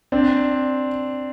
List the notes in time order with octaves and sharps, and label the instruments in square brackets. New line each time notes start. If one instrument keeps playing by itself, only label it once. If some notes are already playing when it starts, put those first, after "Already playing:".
[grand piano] C4 D4